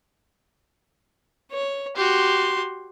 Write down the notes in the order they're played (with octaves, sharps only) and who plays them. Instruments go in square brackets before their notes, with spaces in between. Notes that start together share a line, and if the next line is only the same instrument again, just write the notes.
[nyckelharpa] C#5
[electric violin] F#4 G4 [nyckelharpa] C6